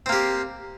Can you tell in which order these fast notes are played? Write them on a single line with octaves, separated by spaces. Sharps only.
C4 A#3 G4